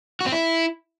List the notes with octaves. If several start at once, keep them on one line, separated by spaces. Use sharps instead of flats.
F#4
C4
E4